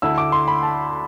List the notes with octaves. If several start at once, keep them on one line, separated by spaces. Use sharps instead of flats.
D2 D3 A3 E4 E6
D6
C6
B5
A5